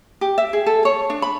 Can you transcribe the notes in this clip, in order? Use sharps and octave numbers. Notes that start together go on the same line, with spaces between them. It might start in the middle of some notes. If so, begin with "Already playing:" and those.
G4
E5
G#4
A4
C#5
D4
B5